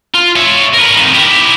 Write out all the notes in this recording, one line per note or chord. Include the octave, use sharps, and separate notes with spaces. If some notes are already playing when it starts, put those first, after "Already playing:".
F4
C#5 E5
A#4 B4
F2 D#3
E4 G4